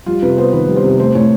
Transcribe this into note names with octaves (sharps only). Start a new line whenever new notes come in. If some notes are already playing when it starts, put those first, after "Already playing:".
G3 F4
C3 B4
B3 C5
D#3 B4
G3
C5
C3
A3 C5
A2 C#5